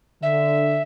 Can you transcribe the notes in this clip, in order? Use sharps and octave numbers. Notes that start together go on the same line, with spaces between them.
D3 E5